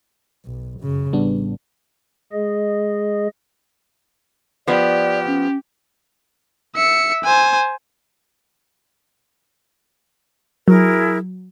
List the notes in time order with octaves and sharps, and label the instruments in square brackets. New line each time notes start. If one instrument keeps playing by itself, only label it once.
[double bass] B1
F#2 C#3
[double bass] A1 [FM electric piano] G3 B3 D4
[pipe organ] G#3 G#4 D#5
[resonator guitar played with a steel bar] F3 B3 [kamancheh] G4 [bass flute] D5
[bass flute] C#4
[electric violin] E5 C#7
C5 G#5
[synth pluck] F#3 [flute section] E4 G#4 A#4